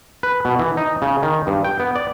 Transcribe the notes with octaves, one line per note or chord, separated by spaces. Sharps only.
B4
B2
E3
D#4
C#3
D#3
G2
G5
B3
D5